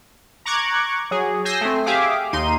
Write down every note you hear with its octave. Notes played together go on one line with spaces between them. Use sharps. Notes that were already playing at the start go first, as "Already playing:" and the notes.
A#5 C#6 D6 F#6 G#6
F#3 G#4
G#5 E6 G6 A#6 C7
A3 C4
G4 G#4 E5 F5 D6
D#2 D#4 C6 D#7